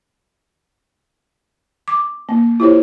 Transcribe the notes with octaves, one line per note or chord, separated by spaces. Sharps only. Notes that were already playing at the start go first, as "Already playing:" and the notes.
D6
A#3
E4 F4 G4 C5 C#5